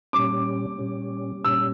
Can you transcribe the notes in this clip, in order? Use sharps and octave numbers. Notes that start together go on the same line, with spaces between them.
A#2 G3 C#4 D6
A#2 G3 C#4
A#2 G3 C#4 E6